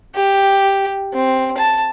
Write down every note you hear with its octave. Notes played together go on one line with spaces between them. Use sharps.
G4
C4
A5